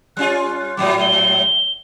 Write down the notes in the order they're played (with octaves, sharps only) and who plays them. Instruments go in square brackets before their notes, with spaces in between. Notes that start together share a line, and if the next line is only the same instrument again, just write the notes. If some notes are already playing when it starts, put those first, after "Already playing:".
[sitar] G3 C#4 F4 [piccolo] F#6
[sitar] G#2 F#3 G3 [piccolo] D6
[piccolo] G7